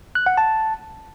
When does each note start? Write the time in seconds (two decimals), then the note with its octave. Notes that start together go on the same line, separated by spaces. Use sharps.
0.15 F#6
0.26 F#5
0.38 A5